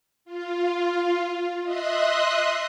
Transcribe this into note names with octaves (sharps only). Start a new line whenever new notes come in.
F4
D#5 E5 C6 D#6 F#6